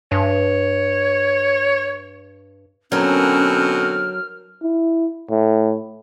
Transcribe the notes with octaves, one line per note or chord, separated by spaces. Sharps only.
G2 C#5
B2 D3 F#3 C4 C#4 A#4 F6
E4
A2